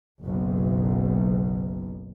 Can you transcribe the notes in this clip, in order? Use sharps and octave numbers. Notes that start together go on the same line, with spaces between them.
F#1 B1